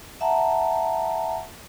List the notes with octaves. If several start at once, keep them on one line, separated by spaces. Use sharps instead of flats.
E5 F#5 A5 A#5